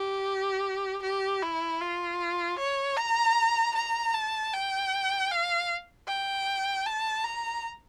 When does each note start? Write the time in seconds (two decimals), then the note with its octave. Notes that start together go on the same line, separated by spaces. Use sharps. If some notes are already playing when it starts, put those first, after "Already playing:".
Already playing: G4
1.02 G4
1.42 E4
1.81 F4
2.59 C#5
2.97 A#5
3.76 A#5
4.14 A5
4.53 G5
5.31 F5
6.08 G5
6.86 A5
7.24 A#5